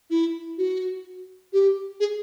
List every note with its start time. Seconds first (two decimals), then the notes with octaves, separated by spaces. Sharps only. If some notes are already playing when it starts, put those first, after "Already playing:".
0.10 E4
0.58 F#4
1.53 G4
2.00 G#4